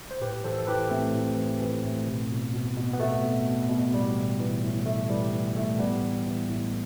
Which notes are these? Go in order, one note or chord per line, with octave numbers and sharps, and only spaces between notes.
C5
A2 G4 B4
E3 A4 C5
A4
E3 G4 B4
A2 A3 C4
A2
E3
E3
A2
B2
B2
B2
B2
B3
B2 A3
B2
B2
B2
A2 G3
E3
E3
A2
A2 A3
E3 G3
E3
A2 A3
A2 G3 B3
E3
E3
A2